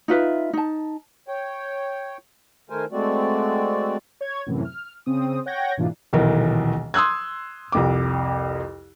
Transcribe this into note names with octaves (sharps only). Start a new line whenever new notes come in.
D#4 F4 B4 E5
D#4 A5
C#5 G5
D#3 A3 A#4 C5 G#5
G#3 A3 C4 F#4 D5
C#5 G#6
F#2 A2 C3 E3
F6
C#3 C4 D#6
C#5 F#5 G5 G6 G#6 A#6
G#2 B2 E3 A#3 D4 F4
D#1 B1 E3 A#4
C6 D#6 E6 F#6 G#6
C2 F2 D6